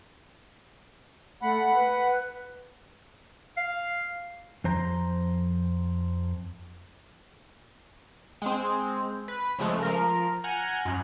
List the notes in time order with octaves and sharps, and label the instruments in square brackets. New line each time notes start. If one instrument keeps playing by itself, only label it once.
[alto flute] A3 [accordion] F#5 B5
[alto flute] B4
[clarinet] F5
[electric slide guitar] F2 C5 A#5
[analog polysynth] G#3 C4
B4 B6
C#3 F3 G#3 A3
F3 A#4
F#5 G#5 A#5 F6 G6
F#2 F#6